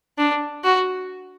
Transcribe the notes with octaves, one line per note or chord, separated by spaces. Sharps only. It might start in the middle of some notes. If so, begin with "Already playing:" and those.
D4
F#4